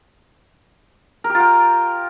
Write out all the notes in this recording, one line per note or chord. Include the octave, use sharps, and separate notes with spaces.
A#4
G4
F4
G5